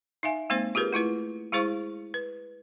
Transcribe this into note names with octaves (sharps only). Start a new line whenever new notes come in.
D#4 E5 F5 G#5
G#3 A#3 C4 D#4 C5
F4 G4 G#4 A#4 B4
A3 E4 F4 B4
G#3 E4 G#4 C5 F5 C#6
B4